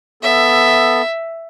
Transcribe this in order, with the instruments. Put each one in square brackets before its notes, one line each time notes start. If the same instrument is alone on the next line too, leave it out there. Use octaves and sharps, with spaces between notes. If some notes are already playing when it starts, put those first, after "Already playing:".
[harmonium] B3 A4 [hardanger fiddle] E5